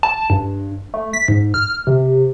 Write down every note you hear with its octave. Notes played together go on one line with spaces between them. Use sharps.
A5
G2
A3
B6
G#2
F6
C3